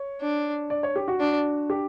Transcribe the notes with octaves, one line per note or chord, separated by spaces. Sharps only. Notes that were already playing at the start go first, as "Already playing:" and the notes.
Already playing: C#5
D4
D5
C#5
G4
F#4
D4
G4